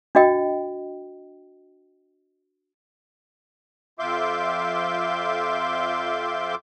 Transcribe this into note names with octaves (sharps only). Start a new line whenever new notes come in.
D4 F#4 D#5 G5
F2 F4 E5 C6 D6 G6